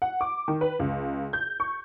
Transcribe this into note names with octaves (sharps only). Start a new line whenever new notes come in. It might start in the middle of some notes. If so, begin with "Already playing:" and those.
F#5
D6
D#3
B4
C#2
G6
C#6